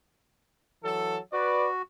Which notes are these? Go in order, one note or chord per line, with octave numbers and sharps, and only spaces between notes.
E3 F#3 A4
F#4 B4 D5